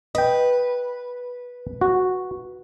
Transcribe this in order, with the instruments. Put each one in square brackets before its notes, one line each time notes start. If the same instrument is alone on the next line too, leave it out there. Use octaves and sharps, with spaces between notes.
[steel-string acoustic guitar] B4 [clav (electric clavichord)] D#5 G5
[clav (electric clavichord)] F#4